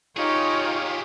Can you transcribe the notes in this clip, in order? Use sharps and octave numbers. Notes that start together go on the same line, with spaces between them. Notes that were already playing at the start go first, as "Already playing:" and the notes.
D#4 F4 G4 G#4 C#5